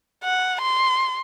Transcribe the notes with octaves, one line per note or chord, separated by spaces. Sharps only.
F#5
C6